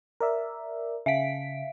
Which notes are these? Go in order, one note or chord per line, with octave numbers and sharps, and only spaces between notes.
A#4 D5 E5
C#3 E5 F5 B6 D7